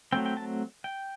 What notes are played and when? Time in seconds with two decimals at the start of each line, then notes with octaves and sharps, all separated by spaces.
0.12 F#3 A3 C4 G5
0.26 G5
0.37 A5
0.84 G5